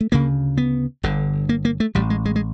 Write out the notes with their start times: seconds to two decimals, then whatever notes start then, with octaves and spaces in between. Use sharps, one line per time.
0.01 A3
0.12 D2 C#3 A#3
0.57 B3
1.03 G1 G2 D3
1.49 A#3
1.65 A#3
1.80 A3
1.95 A1 A2 G3
2.10 G#3
2.25 G#3
2.36 G#3